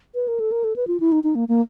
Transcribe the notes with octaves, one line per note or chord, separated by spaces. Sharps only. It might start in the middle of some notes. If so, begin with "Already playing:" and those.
B4
A#4
A4
A#4
A4
B4
F4
E4
D#4
D#4
A#3
A#3